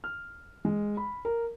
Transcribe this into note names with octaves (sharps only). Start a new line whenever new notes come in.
F6
G#3
B5
A#4